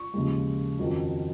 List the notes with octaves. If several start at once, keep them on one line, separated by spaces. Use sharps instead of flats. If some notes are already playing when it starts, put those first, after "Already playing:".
Already playing: C#6
D#2 C#3 F3 G#3
F2 D#3 F#3 C#4